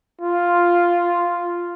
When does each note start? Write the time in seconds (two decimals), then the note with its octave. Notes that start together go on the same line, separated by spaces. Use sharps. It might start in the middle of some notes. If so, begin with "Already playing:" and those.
0.21 F4